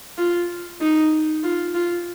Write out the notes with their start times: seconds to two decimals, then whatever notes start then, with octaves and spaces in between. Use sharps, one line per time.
0.18 F4
0.80 D#4
1.43 F4
1.74 F4